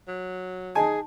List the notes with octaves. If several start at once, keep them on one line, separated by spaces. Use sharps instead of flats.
F#3
D#4 G#4 G#5 A5